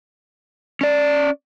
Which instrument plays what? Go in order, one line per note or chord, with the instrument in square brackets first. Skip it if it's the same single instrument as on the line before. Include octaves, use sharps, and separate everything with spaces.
[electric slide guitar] C#4 D5